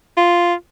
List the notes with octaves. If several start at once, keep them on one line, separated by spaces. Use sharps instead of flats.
F4